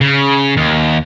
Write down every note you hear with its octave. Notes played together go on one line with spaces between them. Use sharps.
C#3
D#2